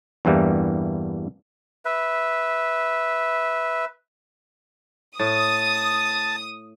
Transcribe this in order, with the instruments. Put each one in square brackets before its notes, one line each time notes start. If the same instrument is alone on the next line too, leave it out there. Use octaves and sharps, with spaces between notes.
[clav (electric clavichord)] E2 G2 E3 G3 A#3
[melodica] B4 E5
[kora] A2 [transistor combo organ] A5 [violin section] D#6